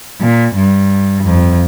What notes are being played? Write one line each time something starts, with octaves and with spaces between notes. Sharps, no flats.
A#2
G2
F2